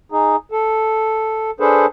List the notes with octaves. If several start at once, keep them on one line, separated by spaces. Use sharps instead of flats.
D#4 G#4
A4
D4 G#4 A4 B4 C5